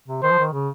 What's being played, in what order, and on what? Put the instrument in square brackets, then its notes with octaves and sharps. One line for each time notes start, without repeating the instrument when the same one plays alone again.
[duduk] C3
[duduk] D#3 [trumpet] C5
[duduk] F3
D#3
C#3